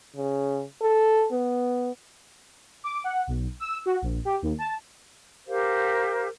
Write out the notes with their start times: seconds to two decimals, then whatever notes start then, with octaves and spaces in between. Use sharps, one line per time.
0.16 C#3
0.81 A4
1.32 B3
2.84 D6
3.04 F#5
3.27 B1
3.60 E6
3.86 F#4
4.02 A#1
4.25 G4
4.42 D#2
4.58 A5
5.47 G4 A#4 C5 F5